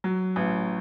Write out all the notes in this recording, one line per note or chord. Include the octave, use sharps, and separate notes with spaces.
F#3
A1